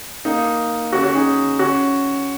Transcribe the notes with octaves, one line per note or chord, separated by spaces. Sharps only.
A#3 D#4
C#4 F#4
C#4 F#4
D#4 G#4
C#4 F#4